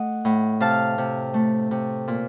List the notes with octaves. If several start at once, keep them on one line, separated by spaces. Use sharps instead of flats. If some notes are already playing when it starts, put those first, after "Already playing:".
Already playing: A3 D#5 F#5
A2
C3 F5 A5
C3
A3
C3
A#2